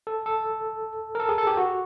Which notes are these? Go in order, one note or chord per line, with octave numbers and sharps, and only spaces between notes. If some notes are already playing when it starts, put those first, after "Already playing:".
A4
A4
A#4
A4
G#4
A4
G4
F#4